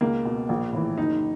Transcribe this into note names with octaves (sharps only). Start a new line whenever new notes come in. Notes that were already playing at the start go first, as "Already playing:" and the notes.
C#2 A#3
B2
A#1
A2 E3
F#1 D#4